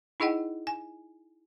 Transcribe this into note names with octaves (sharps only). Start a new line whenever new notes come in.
D#4 E4 G#4 D#5 F#5 G5
G#5